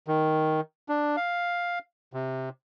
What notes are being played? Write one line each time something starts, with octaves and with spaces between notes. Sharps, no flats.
D#3
D4
F5
C3